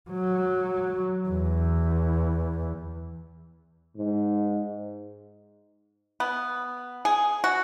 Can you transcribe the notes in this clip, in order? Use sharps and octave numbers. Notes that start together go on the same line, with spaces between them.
F#3
E2
G#2
B3
G#4
F#4